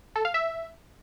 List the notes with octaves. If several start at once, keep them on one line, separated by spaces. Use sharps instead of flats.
A4
F5
E5